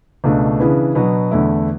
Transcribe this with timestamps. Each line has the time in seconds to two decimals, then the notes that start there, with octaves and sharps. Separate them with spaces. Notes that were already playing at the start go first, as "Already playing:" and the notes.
0.24 C#2 B2 A3 D4
0.60 C#3 E3 B3 D4
0.95 B2 F#3 B3 D4
1.31 E2 D3 A3 E4